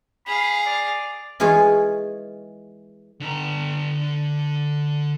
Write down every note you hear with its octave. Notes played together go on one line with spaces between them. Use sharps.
G#4 F5 B5
D5
E3 G#3 F4 G#4 C#5
D3 A#5